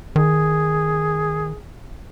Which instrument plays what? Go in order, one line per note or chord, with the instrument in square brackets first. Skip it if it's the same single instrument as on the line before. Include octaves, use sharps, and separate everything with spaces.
[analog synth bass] D#3 [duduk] G#4